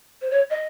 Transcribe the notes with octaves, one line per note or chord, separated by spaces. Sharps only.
C5
C#5
D#5